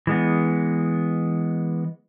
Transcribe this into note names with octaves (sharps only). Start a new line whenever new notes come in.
E3 G#3 B3